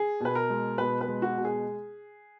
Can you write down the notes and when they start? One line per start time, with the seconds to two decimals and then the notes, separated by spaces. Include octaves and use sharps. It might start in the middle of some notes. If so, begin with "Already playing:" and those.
Already playing: G#4
0.20 B2 B4
0.35 A#4
0.50 G#3
0.78 B2 B4
1.01 B4
1.08 G#3
1.22 F#4
1.37 B2
1.45 G#4